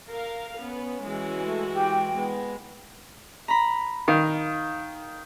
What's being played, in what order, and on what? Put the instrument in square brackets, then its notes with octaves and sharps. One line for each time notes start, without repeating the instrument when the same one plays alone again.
[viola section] A#4 F5
[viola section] B3 [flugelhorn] C#4
[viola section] E3 G#3 F#4
[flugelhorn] A3
[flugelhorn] G4 [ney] G5
[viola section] G#3 [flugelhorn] B3
[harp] A#5 B5
[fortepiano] D#3 [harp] F5